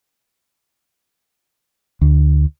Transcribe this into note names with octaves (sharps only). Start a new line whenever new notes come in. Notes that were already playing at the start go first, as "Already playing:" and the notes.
D2